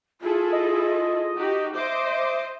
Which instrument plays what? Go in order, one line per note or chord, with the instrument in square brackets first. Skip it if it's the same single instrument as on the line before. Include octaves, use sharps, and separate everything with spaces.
[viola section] E4 G#4 A4 [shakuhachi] F4
[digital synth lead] D#5
[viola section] D#4 F#4 G4
[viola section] C5 D#5 [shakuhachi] E5 [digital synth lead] D6